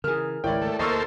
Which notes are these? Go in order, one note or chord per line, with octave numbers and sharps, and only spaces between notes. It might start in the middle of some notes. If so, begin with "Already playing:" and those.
C#3 E3 G#4 A#4 F6
G#1 C#2 E4 A#4 C#5 D5 G5
A3
D2 B2 A#3 A4 C5 D#5 C#6 E6